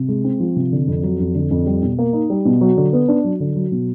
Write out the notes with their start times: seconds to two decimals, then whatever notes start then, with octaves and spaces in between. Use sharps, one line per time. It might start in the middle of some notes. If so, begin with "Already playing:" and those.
Already playing: C3
0.08 G#3
0.24 C4
0.40 F3
0.56 C3
0.72 D3
0.87 F2
1.03 F#3
1.20 F2
1.35 D3
1.51 F2
1.66 G3
1.83 B2
1.99 A#3
2.13 D#4
2.30 G3
2.45 B2
2.61 F#3
2.77 D3
2.93 B3
3.08 D4
3.24 F#3
3.40 D3
3.56 F#3
3.72 B2